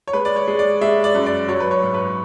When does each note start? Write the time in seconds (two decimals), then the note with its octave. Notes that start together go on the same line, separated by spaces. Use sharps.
0.08 C#5
0.13 G#3 B4
0.25 D5
0.36 C#5
0.48 G#3
0.59 D5
0.81 G#3 E5
1.04 D5
1.15 F#2
1.26 D5
1.49 F#3 C#5
1.60 B4
1.71 C#5
1.83 G#2
1.94 B4